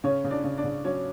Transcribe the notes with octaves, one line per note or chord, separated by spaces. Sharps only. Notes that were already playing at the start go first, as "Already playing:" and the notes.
C#3 C#4 C#5
C#3
D4 D5
C#3
D4 D5
C#3
F#3 C#4 C#5